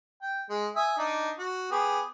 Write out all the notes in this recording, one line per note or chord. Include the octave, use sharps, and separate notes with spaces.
G5
G#3
E5 G#5 D#6
D4 D#4
F#4
B3 G4 G#4